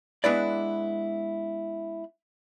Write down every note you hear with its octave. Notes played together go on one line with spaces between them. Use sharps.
G#3 B3 D4 E4 B4 D5